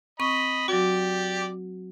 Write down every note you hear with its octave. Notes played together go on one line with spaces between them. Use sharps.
C4 D#5 B5 C#6
F#3 F#4 G4 D5